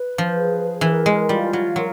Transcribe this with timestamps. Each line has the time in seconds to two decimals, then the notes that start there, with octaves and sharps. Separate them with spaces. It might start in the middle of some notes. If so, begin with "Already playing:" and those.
Already playing: B4
0.18 F3
0.34 G#4
0.81 E3 A#4
1.06 G#3
1.29 G3 F4
1.53 F#3
1.76 F#3 A#4